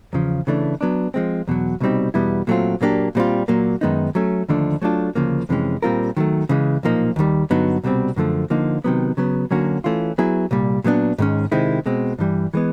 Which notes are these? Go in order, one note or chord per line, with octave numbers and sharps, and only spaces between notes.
E2 C#3 F3
C#3 E3 A3 D4
F#3 B3 D4
F3 G#3 C4
E2 B2 F#3
C2 B2 G3 C4 D#4
E2 B2 G3 B3 E4
A#2 F#3 A3 C4 F4
A#2 F#3 A#3 D4 G4
A#2 G3 C4 F4
A#2 F#3 A#3
F#2 D#3 G#3 B3 D#4
F#3 A3 C#4
D#2 D3 F3 A3 D4
F#3 A3 D4 F4 A4
D2 C#3 F3 A#3
F2 C3 E3 G#3 C#4
A#2 G3 C4 F4 A#4
D#3 F#3 A3
C#3 E3 G#3
B1 A#2 F3 A#3 D#4
D#2 D#3 G3
G2 D3 F#3 B3 D#4
C2 B2 G3 C4
F#2 D3 F3 A3
D3 F3 A#3 D#4
C3 D#3 F#3 B3
C#3 F#3 B3
D3 F#3 A#3 C#4 F#4
E3 A3 C#4 F4
F#3 B3 E4 G#4
C2 A#2 G3
A#2 F#3 B3 D4
G#2 D#3 G#3 C#4
C3 D#3 G#3 C4 E4
B2 G#3 C4
G2 E3 G3
E3 G#3 B3